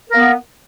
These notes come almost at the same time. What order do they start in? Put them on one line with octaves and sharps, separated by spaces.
A#4 A#3 B3